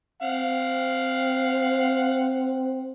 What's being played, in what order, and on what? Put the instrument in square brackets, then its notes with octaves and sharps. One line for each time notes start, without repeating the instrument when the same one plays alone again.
[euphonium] C4 [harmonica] F5 F#5